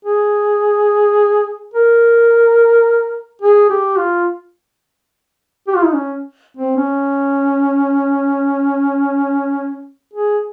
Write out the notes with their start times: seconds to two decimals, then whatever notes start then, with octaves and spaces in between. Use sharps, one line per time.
0.05 G#4
1.74 A#4
3.42 G#4
3.70 G4
3.98 F4
5.68 G4
5.76 F4
5.84 D#4
5.93 C#4
6.57 C4
6.77 C#4
10.14 G#4